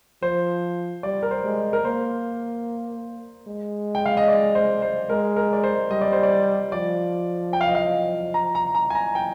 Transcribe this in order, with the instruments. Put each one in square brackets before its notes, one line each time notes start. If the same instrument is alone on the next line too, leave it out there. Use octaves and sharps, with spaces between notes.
[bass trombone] F3 [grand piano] C5
[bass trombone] G3 [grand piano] D5
[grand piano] A#4
C5
[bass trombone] G#3
[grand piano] A#4
[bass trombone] A#3 [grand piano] C5
[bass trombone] G#3
[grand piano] G5
F5
D#5
D5
C5
C5
[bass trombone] G#3 [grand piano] A#4
[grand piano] A#4
D5
C5
[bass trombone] G3 [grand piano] D#5
[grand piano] D5
C5
D5
[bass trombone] F3 [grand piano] D5
[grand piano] G5
F5
D#5
F5
A#5
A#5
A#5
G#5
A#5
G5